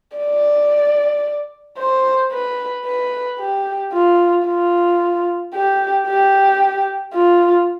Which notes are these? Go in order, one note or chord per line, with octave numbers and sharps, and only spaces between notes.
D5
C5
B4
B4
G4
F4
F4
G4
G4
F4